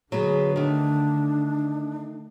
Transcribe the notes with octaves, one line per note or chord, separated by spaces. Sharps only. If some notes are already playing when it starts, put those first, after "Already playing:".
D3 F#3 B3 G#4 B4
D#3 A3 D4